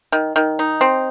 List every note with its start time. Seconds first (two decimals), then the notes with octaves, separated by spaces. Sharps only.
0.12 D#3
0.36 D#3
0.59 D#4
0.81 C4